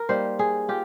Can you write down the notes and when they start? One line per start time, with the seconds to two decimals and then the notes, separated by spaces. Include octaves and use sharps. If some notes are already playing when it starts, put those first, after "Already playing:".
Already playing: A#4
0.09 G3 A#3 D#4 C5
0.39 G#4
0.68 F4 G4